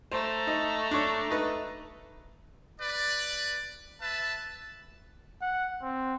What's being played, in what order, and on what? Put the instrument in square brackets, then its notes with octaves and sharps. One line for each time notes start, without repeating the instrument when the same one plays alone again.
[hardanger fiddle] A3 A#5 [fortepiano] C5
[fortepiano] D#4
D4 C#5
D#4 B4
[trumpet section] B4 D5
B4 E5 A5
[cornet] F#5
C4